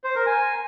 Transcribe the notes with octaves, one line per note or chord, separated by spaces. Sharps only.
C5
A#4
G#5